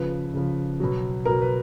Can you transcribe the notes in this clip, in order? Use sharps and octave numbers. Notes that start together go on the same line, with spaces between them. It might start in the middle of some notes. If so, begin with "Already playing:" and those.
Already playing: C#3 F3 B4
C#3 F3
B2 F#3
B2 F#3 A#4
B4